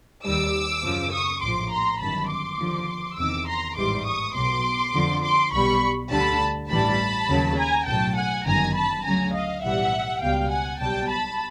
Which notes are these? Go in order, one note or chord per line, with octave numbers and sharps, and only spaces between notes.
D#2 D#3 G3 D6 E6
F#2 C#3 F3
C#6 D#6
A#1 A2 F3 C6 D6
A#5 C6
G1 F#2 D#3 F#3 A5 B5
C6 D6
D#2 D3 F3
E2 C3 D#3 D6 E6
A#5 C6
A1 G#2 E3 G3 C6 D6
C#6 D#6
B1 B2 F#3 C6 D6
F2 D3 F3
C6 D6
B1 B2 G3 B5 C#6
D2 D3 G3 A5 B5
A1 G2 E3 G3 A5 B5
D#2 C#3 F#3
G#5 A#5
B1 A2 F#3 G5 A5
F#5 G#5
G1 F#2 D#3 G#5 A#5
A5 B5
D2 C#3 F#3 G#5 A#5
D#5 F5
B1 A2 E3 G3 E5 F#5
C#2 B2 G3 F5 G5
F#5 G#5
B1 B2 G3 G5 A5
A5 B5